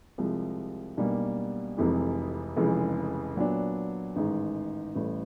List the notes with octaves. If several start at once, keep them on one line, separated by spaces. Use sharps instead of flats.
C2 C3 F3 G#3
B1 B2 G3 A#3 D4
F1 F2 C3 E3 G#3
F1 F2 C#3 E3 G#3
A#2 F#3 B3 D4
A1 G#2 D#3
A1 A2 E3 G3